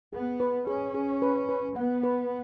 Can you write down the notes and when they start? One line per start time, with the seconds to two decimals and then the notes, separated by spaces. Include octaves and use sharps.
0.13 B3 G#4
0.40 B4
0.67 C#4 G#4
0.94 G#4
1.22 B4
1.49 B4
1.76 B3 F#5
2.03 B4